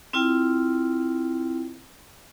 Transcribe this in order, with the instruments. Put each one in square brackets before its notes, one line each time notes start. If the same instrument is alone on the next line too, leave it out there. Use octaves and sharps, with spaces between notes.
[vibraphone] C4 E4 F4 G5